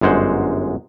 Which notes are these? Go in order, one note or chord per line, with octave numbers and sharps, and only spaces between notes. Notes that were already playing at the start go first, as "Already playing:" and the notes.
G1 F#2 G#3 C5 F#5